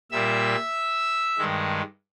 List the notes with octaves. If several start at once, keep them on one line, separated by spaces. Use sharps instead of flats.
A#2 G3 A#3 E5 E6
G2 D#3 G#3